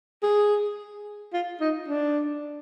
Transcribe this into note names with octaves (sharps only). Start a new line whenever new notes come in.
G#4
F4
D#4
D4